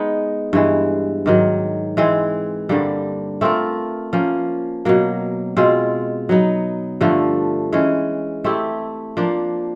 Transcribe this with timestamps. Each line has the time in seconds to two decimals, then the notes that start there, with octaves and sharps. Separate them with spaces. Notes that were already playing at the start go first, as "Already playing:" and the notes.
Already playing: G#3 B3 D#4
0.53 G2 E3 G#3
1.26 G#2 D#3 F#3
1.97 E3 G#3 C4
2.69 G2 D3 G3 A#3
3.41 A3 C4 F4 A#4
4.13 F3 A#3 C#4
4.85 B2 F#3 A#3
5.57 B2 G#3 C4 F4
6.29 F#3 B3 D#4
7.01 G2 D3 F3 A3
7.72 E3 G#3 C#4
8.44 A3 C4 E4 G4
9.17 F3 A#3 D4